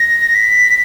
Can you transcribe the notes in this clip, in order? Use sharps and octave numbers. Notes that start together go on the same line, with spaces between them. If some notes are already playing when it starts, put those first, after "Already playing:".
Already playing: A#6
B6